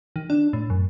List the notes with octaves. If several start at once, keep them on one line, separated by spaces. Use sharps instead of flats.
D#3
D4
A2
F#2